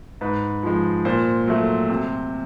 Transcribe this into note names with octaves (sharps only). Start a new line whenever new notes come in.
G#2 B4
F3 G#3
A#2 C5
F#3 A3
C3